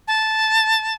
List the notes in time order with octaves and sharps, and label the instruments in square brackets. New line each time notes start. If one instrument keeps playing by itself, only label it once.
[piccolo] A5